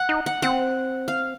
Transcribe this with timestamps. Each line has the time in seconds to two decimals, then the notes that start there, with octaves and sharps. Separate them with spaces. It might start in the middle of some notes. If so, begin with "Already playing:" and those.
Already playing: F#5
0.09 D#4
0.26 F#5
0.42 C4 F#5
1.08 F5